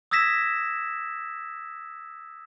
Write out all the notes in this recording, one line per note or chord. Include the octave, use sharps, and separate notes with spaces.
D#6 E6 G#6 A#6 B6 E7